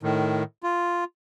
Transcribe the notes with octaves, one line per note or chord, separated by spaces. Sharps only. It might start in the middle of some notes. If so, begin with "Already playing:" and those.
A2 D#3
F4